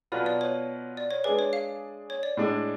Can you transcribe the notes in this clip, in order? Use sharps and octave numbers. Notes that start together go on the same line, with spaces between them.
B2 F#3 B3 F4 B4 D5
D5
C#5
D5
C#5
G#3 D4 G#4 B4 D5
C#5
F5
C#5
D5
A2 G#3 D4